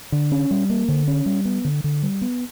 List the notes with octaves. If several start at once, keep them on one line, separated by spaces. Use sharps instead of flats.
D3
C#4
G3
A#3
D3
C#4
G3
B3
D3
D3
G3
B3